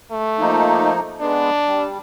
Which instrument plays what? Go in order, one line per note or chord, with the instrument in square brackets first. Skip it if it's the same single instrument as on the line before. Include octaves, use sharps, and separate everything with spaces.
[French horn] A3
[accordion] F3 A#3 D#4
[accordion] G#3 B3 [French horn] D4
[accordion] G3